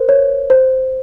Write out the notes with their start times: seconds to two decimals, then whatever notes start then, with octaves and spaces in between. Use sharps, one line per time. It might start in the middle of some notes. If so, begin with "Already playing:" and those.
Already playing: A#4 C5
0.09 C#5
0.50 C5